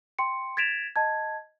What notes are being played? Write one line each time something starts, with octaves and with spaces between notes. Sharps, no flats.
G5 C6 C#7
G#6 A6 B6 D7 E7 F7
D#5 A5 G#6